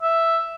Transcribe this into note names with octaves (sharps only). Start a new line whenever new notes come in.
E5